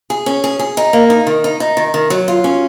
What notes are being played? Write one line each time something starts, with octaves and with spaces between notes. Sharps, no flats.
G#4
C#4
G#4
G#4
D#4
A#3
D#4
D#3
D#4
D#4
D#3
D#3
F#3
F4
C#4